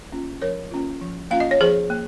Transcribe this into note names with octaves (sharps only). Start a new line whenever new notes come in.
A#3 C#4 F4
F3 A#4 C#5
A#3 C#4 F4
F3
A#3 C#4 F4 F5
D#5
C#5
F3 G#4 C5
A#3